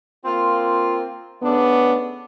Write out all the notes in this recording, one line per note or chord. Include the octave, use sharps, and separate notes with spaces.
A#3 C4 F4
C#3 A3 B3 D4